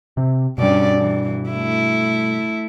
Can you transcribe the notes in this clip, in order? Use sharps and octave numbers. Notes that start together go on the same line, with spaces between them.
C3 C4
G2 B2 G3 C#4 D5
E3
A3 E4